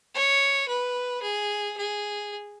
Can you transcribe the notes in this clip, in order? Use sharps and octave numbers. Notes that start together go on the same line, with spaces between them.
C#5
B4
G#4
G#4